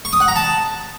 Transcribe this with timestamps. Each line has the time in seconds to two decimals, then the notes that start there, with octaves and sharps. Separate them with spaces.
0.05 C#6
0.13 D#6
0.20 F#5
0.28 A#5
0.36 A5